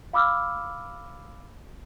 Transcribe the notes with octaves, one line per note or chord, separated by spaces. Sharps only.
F5 B5 D6 E6 F6